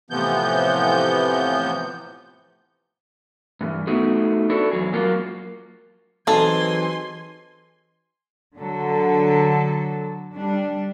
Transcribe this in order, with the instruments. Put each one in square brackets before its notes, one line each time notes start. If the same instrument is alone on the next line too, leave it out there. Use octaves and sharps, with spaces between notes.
[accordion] A2 C3 E3 F3 B3 G6
[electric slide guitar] G2 E3
A3 B3 D#4 F#4 G#4
D4 E4 F#4 A4
E2 F#3 G#4
F#3 A#3 F4
[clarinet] E3 [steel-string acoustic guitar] F#3 C4 D#4 [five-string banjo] G#4 A4 [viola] G#5 C6
[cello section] D3 F#3 A4
G3 D4